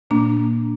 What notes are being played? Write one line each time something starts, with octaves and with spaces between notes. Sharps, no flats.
A#2 A#3 D4